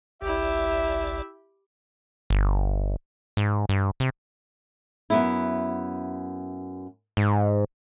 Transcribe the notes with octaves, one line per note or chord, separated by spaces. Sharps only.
G#1 C#2 E4 G4 D5 E5
G1
G#2
G2
C3
F#2 B3 E4
G#2